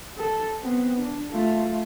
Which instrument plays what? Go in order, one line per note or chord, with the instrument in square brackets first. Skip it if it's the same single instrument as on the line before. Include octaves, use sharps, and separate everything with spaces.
[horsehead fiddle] A4
B3 C4
D4
A3 F4